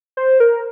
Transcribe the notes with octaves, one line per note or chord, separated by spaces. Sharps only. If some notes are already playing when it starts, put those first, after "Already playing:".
C5
A#4